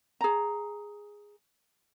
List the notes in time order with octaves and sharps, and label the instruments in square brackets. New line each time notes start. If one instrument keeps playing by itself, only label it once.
[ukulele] G#4 A#5